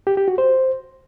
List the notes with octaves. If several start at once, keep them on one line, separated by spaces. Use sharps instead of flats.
G4
G4
F#4
C5